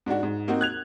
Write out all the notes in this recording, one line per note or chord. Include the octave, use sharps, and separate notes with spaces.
G#2 G#3 D4 F#4
G#2
A#3 C4 D#4 F#4
F#6 G#6 F7